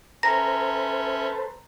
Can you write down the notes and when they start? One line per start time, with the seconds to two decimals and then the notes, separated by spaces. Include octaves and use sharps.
0.23 C#4 A4 B4 C5 E5 A#5 A#6